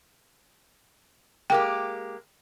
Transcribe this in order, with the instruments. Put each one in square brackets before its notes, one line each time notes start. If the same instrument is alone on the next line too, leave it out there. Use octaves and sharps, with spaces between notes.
[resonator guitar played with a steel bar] G#3 A#3 G4 [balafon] G5